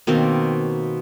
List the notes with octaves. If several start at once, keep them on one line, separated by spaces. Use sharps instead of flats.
B2 D#3 A#3 C4